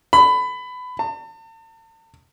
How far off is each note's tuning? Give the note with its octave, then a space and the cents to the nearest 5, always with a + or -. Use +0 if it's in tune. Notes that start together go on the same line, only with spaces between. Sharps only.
B5 +20
A5 +40